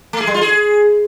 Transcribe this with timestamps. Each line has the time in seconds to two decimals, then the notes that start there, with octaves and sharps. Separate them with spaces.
0.13 A3
0.20 G#4
0.27 G3
0.34 F4
0.41 G#4